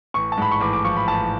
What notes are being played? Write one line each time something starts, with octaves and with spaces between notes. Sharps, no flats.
A1 C#6
A5
G#2 B5
C#6
A1 D6
D6
F3 C#6
B5
A1 A5